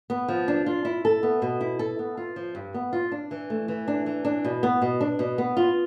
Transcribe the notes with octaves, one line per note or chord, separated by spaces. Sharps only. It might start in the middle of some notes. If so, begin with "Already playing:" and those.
B3
F3
D4
F4
E4
A4
B3
B2
E4
A4
B3
F4
F3
G2
B3
F4
D4
E3
A3
E3
D4
E3
D4
B2
B3
B2
D4
B2
B3
F4